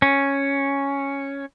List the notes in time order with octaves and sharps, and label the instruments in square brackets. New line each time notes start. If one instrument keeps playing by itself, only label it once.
[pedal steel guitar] C#4